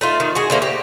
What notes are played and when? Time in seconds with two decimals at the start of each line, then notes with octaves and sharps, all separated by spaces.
0.01 A3 D#4 F4
0.20 D#3
0.35 F#4 G#4
0.50 D3 A3 A#3 C5
0.62 G4